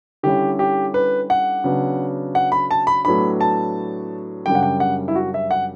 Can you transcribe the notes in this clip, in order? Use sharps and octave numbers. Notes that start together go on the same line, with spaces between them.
D3 G3 C#4 E4 G4
G4
B4
F#5
C#3 F#3 B3 D4
F#5
B5
A5
B5
A2 F#3 B3 D4 B5
A5
F#2 C#3 G3 D4 G5
F#5
G5
F#5
E4
F#4
E5
F#5